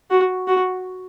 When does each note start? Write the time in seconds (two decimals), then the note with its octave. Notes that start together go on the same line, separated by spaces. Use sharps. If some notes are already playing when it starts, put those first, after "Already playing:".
0.10 F#4
0.48 F#4